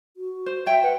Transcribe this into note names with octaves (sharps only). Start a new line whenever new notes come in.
F#4
C5
C#5 E5 G5
B4 F#5